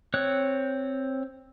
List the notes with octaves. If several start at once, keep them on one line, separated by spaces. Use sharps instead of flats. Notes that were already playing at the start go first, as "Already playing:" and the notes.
C4 C#5 F#6